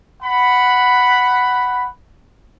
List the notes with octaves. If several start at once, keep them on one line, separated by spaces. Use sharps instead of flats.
F#5 B5